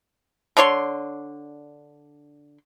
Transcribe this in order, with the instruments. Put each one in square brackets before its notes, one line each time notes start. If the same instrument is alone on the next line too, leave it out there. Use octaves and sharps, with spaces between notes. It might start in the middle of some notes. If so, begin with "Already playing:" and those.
[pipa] D3 D4 C#5 C6